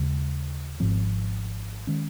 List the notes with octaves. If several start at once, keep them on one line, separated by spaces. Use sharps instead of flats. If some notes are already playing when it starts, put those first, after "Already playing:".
Already playing: D#2 C#3 G#3
G#1 G#2 F3 C4
D#3 G#3 C#4